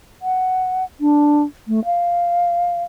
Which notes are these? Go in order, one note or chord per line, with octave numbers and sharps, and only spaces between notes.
F#5
D4
A3
F5